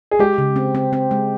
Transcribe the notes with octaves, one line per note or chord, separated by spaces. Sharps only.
G#4
G#3 G4
C#3
C4
C4
C4
G#3